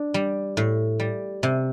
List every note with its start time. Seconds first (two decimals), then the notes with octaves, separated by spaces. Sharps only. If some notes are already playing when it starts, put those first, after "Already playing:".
Already playing: D4
0.14 G3
0.57 A2
1.00 G3
1.43 C3